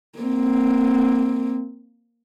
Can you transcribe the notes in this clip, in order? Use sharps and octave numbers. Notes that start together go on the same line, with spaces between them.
A#3 C4